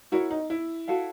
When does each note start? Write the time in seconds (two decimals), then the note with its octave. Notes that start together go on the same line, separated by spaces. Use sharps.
0.12 E4 F#4 A#4 C#5
0.30 D#4
0.50 E4
0.88 F#4 A4 C#5 F5